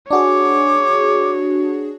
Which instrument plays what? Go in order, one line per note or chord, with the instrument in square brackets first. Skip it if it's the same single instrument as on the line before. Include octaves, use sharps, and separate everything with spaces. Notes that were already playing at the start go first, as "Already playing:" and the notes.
[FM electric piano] D4 F#4 G#4 [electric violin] C#5 [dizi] D6